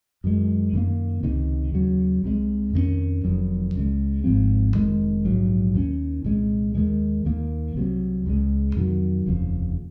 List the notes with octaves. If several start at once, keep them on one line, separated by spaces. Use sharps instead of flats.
F#2 D#3 G#3
F#2 D#3 A#3
C#2 C3 D#3
D#2 C#3 F#3
C2 C3 F3 G#3
F2 D#3 A#3 C#4
F1 F2 D#3 F#3
C#2 C#3 G#3
G#1 G#2 F3 C4
F1 D#2 D#3 G#3
A#1 G#2 F#3
D#2 D#3 A#3 C#4
C2 A#2 G#3
D#2 D#3 G#3
D#2 D#3 A#3
C2 C3 F#3
C#2 C#3 G#3
F2 C3 D#3 F#3
F1 D#2 C#3 F3